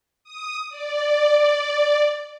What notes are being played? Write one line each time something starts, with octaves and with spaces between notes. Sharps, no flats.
D#6
D5